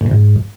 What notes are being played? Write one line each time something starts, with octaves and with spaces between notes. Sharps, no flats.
A2
B2
G#2